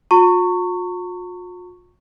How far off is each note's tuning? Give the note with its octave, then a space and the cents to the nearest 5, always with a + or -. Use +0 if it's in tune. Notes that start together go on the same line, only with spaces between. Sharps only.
F4 +45 A#5 -45 C#6 +0